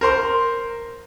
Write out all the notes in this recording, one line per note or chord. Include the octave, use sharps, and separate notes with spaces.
A#4 C5 C6